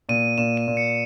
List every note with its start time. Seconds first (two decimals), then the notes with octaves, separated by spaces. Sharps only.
0.09 A#2 D#7
0.38 A#2 E7
0.57 D#7
0.67 A#2
0.77 C#7